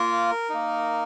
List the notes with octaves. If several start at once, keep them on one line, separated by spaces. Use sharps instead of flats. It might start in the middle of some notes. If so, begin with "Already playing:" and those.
Already playing: A#3 F4 A#4
A#3 D#4